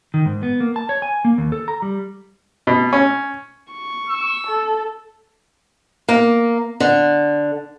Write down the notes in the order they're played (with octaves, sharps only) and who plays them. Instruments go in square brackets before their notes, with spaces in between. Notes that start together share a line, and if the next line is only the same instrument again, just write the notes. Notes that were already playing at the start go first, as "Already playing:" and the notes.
[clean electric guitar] D#3
G#2
B3
A#3
A5
C#5
G#5
A#3
D#2
A4
A#5
G3
[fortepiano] B2
C#4
[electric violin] C#6
[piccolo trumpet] E6
[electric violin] A4
[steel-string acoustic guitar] A#3
D3